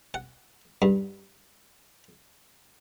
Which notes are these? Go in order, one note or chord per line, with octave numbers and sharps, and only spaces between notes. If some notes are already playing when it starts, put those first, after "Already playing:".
F#5
G2